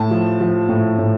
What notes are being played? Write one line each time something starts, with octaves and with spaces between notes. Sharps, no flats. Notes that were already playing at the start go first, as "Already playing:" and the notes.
Already playing: A2 A5
F3
F3
A2
A2